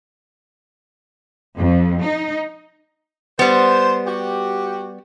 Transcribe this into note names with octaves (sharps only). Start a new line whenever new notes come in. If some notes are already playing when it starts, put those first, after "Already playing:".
F2
D#4
G3 B3 C5
F#4 G4